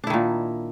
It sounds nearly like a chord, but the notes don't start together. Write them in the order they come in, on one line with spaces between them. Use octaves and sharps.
D4 E4 D#3 A#2